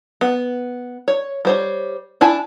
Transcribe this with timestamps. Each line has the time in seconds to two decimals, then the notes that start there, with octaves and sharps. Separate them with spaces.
0.21 B3
1.08 C#5
1.45 G3 C5 C#5
2.21 D4 E4 G#5 A5